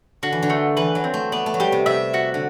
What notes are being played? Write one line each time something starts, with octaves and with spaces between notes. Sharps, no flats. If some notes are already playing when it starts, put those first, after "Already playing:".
D3 F#4
E3
D3
A3
E3 B4
F#3
C4
A3
B3 D5
A3
F#3
G3 G4
C3
C3 E5
F#4
D3